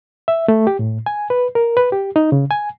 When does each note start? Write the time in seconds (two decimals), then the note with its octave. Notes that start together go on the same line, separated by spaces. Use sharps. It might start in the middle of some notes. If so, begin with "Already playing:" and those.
0.28 E5
0.48 A3
0.67 G4
0.79 A2
1.06 G#5
1.30 B4
1.55 A#4
1.77 B4
1.92 G4
2.16 D#4
2.32 C#3
2.51 G#5